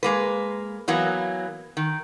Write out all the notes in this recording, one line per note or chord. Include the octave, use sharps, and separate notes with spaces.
G#3 A#3 B4
E3 F#3 A#3 B3
D#3